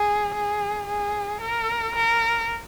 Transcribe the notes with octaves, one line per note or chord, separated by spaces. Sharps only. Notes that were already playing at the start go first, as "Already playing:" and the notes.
Already playing: G#4
G#4
G#4
A#4
A#4